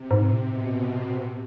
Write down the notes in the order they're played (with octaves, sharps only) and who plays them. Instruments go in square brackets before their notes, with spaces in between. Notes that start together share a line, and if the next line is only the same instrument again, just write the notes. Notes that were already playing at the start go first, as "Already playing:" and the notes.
Already playing: [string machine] C3
[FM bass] G#2
A2
[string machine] B2
C3